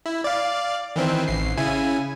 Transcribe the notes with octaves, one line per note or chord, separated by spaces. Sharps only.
E4
D5 F5
D#3 E3 C4
A1 C7
C#3 E4 G#5